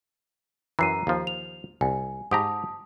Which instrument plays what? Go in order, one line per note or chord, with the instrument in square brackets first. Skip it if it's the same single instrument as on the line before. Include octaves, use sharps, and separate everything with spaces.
[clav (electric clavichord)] F#2 E3 [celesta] A#5 C7 D#7
[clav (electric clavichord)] D#2 F3
[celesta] F7
[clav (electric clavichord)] C2 [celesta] G#5
[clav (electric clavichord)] G#2 G4 A#5 [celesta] A5 D#6